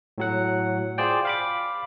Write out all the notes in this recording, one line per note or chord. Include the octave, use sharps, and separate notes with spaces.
A2 F#3 F#5
F4 G#4 C5 D5 G5
F5 B5 D6